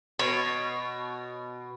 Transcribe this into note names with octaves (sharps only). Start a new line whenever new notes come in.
B2 C#5